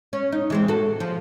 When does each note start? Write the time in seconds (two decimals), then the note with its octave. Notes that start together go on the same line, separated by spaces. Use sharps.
0.13 C#4
0.32 D#4
0.50 E3 G#3 C4
0.68 F#4 A4
1.00 F3